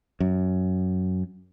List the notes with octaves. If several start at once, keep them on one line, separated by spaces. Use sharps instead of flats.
F#2